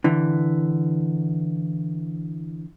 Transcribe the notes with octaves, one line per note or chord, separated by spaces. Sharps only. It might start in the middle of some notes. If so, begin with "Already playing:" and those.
D3 E3